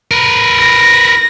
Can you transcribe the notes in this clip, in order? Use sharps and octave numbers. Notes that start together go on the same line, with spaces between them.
A#4 B4
A#6